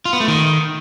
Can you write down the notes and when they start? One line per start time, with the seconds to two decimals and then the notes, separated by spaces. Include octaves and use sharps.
0.05 F4
0.13 B3
0.20 A3
0.28 D#3